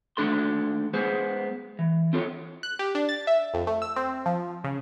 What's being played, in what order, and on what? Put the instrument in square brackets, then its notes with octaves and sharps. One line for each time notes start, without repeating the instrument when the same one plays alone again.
[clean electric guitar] D#2 A3 D4 A4 C6
G#3 B3 G#4 C5
E3
C4 F4 A4 C#5
[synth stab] F#6
G4
D4
A6
E5
F2
A3
E6
C4
F3
C#3